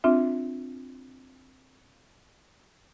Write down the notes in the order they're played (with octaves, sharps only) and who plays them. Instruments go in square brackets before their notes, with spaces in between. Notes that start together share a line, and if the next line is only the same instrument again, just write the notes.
[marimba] C4 D4 F4 E5